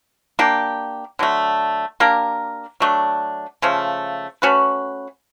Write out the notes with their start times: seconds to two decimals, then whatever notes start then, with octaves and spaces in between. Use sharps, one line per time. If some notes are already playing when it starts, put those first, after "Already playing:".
0.39 A#3 D4 G4
1.19 D3 F#3 A3
2.00 A#3 D4 G4 A#4
2.80 F#3 A3 D4
3.62 C#3 F3 A3
4.42 A3 C#4 F#4 B4